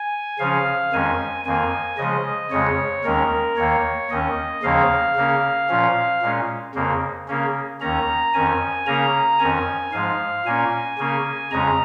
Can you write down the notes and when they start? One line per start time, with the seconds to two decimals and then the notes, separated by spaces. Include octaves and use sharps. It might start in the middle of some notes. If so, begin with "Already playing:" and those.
Already playing: G#5
0.39 C#3 F3 C#4 F5
0.92 F2 D#3 G#3 C#4 G#5
1.45 F2 D#3 A#3 G#5
1.98 C#3 F3 G#3 D#5
2.51 F2 C#3 G#3 C#5
3.04 D#2 D#3 G#3 C#4 A#4
3.57 D#2 D#3 A#3 C#5
4.10 D#2 D#3 C#4 D#5
4.63 D#2 C#3 F3 A#3 C#4 F5
5.16 C#3 A#3 C#4
5.69 A#2 F3 C#4
6.22 A#2 G#3 C#4
6.75 F2 C#3 A#3
7.28 C#3 A#3 C#4
7.81 D#2 D#3 C#4 A#5
8.34 F2 D#3 C#4 G#5
8.87 C#3 A#3 C#4 A#5
9.39 F2 D#3 C#4 G#5
9.92 G#2 F3 G#3 F5
10.46 A#2 A#3 C#4 G#5
10.98 C#3 A#3 C#4
11.51 F2 C#3 G#3 C#4 A#5